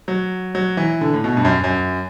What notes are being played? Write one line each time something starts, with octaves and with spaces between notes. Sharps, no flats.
F#3
F#3
E3
D3
A2
B2
G2
F#2
F#2